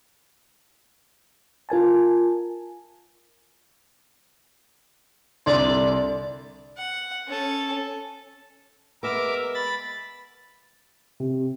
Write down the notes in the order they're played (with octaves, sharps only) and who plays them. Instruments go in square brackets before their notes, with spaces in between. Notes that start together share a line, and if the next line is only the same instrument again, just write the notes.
[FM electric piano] F4 A#4 G#5 A5
[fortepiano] C2 D3 C6 [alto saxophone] D5
[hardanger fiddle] F#5
C#4 A4
[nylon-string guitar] G#3 B3 [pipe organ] A#4 E5 D6
[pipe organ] B5 A6
[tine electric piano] C3